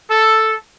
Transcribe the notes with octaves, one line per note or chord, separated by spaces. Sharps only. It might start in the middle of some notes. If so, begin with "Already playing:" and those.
A4